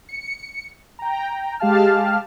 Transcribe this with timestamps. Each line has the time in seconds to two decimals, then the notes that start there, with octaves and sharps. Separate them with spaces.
0.09 C#7
0.99 G5 A#5
1.59 G#3 G4 F5 A5 F6